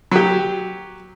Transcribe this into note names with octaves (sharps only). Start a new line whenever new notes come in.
F#3 G4